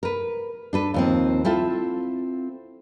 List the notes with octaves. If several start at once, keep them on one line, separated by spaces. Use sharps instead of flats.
A#4 B4
D4 A4 B4
D#2 F3 C4
C4 E4 F4 A4